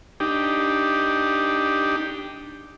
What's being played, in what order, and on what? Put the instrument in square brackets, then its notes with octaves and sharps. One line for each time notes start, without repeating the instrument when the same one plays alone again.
[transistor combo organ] D4 D#4 G4